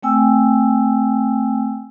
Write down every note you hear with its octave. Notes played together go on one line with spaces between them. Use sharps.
A3 C4 G5 G#5 E6